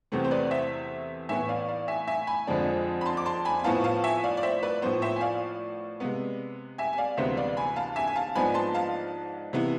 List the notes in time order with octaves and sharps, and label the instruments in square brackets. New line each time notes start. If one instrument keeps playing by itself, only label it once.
[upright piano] E2 C3 E3 A3 C4
C5
B4 D5
C5 E5
A2 E3 B3 E4 E5 G#5
D5 F5
D5 F5
E5 G#5
E5 G#5
G#5 B5
F2 D3 F3 G#3 D4
B5
A5 C6
D6
A5 C6
G#5 B5
G#5
A2 F3 B3 E4 F5 A5
F5 A5
E5 G#5
D5 F5
D5
C5 E5
B4 D5
A2 F3 B3 C5
C5 E5
G#5
D5 F5
C3 G#3 B3
E5 G#5
G#5
D5 F5
D2 C3 E3 G#3 B3 C5 E5
D5 F5
G#5 B5
F5 A5
E5 G#5
G#5
F5 A5
G#2 F3 B3 D4 G#5 B5
A5 C6
F5 A5
C3 E3 B3 E4